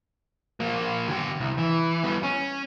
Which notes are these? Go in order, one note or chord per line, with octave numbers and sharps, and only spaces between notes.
F3 A#3
D3 G4
C2
E3
G3 B3
C#4